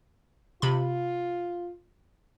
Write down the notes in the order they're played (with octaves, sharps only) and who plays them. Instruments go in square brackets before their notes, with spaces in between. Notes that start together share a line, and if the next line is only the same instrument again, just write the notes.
[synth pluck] C3 B5 [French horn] F4